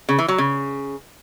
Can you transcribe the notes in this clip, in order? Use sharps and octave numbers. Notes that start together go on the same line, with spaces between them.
C#3
E3
F#3
C#3